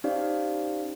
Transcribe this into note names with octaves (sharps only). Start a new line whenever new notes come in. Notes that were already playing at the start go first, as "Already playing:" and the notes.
C#4 D#4 G4 C5 D5 F5